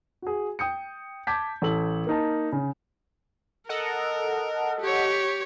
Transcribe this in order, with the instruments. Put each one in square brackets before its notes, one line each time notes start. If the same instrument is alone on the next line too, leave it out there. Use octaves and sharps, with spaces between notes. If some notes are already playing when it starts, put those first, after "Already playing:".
[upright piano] F#4 G#4
G5 D#6 G6 C#7
A5 D6 G6 G#6 B6
A1 A4 F#7
A#3 D#4 A5
C#3
[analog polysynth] A4 D#5 F#5 [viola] A#4
[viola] G4 C#5